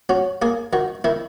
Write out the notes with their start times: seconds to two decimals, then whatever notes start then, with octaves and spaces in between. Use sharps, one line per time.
0.09 C#4 F#4
0.42 A#3 G#4
0.73 D#3 F#4
1.04 D#3 E4